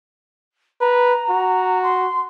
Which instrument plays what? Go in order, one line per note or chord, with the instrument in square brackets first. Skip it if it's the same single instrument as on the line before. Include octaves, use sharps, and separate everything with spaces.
[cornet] B4 [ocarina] A#5
[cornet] F#4
[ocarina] C6